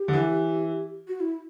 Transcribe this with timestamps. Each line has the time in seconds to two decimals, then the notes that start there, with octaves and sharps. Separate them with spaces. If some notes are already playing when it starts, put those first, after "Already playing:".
Already playing: G4
0.08 D3
0.13 E3
1.08 F#4
1.20 E4